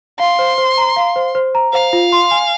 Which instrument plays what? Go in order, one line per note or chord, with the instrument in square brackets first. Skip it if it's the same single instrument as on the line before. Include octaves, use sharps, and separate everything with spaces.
[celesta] F5 [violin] C6
[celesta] C5
C5
A#5
F5
C5
C5
A#5
[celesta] C5 [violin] F5
[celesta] F4
C6
G#5